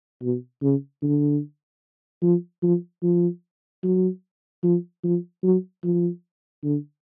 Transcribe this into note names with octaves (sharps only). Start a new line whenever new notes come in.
B2
C#3
D3
F3
F3
F3
F#3
F3
F3
F#3
F3
D3